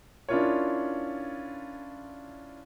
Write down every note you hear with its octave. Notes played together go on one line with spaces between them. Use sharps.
C#4 D4 E4 F4 A#4 C#5